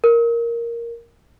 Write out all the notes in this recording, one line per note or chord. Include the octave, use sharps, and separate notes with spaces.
A#4